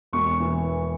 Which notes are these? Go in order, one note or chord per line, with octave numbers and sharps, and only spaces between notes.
E1 C#6
E3